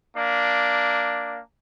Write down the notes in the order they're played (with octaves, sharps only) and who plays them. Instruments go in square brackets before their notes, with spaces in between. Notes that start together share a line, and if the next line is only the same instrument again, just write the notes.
[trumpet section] A#3 D4